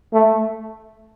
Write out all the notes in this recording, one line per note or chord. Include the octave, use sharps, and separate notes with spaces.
A3